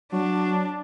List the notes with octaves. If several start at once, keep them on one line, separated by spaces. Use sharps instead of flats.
F#3 D4